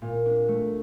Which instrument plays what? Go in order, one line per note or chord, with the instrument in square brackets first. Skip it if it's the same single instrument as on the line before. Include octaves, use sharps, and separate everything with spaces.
[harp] A#2
D4
A3